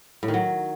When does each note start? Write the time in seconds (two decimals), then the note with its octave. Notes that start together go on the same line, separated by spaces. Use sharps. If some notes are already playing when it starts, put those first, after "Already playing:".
0.23 A2
0.28 D#3
0.34 F#3